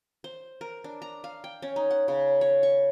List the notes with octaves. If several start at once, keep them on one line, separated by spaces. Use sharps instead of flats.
C5
A#4
D4
A#5
F5
G5
C#4
D#4
F#5
C#3
C#5
C#6